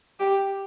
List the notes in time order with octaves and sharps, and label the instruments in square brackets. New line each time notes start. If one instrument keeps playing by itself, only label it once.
[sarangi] G4